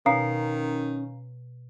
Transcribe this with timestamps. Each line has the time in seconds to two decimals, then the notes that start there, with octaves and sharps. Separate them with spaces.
0.06 B2 D#3 C#4 F5 A#5 C7